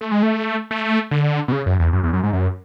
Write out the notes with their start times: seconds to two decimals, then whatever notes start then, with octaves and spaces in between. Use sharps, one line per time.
0.01 A3
0.12 G#3
0.23 A3
0.71 A3
1.11 D3
1.48 B2
1.52 C#3
1.66 F#2
1.79 E2
1.93 F#2
2.03 E2
2.13 F#2
2.23 G#2
2.33 F#2